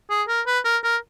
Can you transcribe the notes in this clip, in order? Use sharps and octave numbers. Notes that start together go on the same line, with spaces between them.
G#4
A#4
B4
A#4
A#4